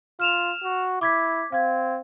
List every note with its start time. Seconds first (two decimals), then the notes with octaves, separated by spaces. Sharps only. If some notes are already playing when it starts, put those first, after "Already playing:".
0.20 F4 F6 E7 F7
0.64 F#4
1.01 E4 D6 G#6 B6
1.52 C4 F5 G#6